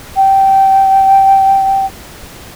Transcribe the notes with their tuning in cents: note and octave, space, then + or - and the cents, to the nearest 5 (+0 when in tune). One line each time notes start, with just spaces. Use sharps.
G5 -15